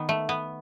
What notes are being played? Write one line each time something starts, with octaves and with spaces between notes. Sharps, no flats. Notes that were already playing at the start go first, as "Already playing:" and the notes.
Already playing: D#3 B3
A3
B3